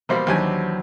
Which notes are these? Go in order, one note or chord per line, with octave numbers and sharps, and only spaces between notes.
B2 E3 G3 A#3 C5
D#2 E3 F#3 D4 G4 G#5